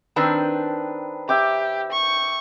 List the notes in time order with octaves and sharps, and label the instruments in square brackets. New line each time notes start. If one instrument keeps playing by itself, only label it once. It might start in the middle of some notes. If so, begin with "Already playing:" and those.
[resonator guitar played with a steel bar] D#3 C4 D4 [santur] B4
[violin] G4 [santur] E5 G5 D6
[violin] C#6